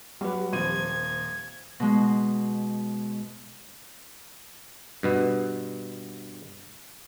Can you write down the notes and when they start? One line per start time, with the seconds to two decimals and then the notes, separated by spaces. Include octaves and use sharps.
0.21 F#3 G3 B4
0.53 D#1 F3 G3 C4 G#6 D#7
1.80 B2 G#3
5.03 G2 B2 B3